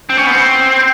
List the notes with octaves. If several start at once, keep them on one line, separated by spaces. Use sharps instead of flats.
C4
C#4
B3
C4